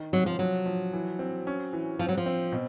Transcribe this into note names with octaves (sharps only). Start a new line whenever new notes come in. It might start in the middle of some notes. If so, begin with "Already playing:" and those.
Already playing: D#3
C3 F#3
F3
F3 F#3
F3
E3
C4
C#4
E3
F3 C4
F#3
F3
C4
B2